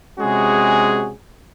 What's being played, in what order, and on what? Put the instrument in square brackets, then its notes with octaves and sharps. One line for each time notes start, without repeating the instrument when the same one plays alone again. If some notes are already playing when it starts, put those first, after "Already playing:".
[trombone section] C3 G#3 C#4 F#4 G#4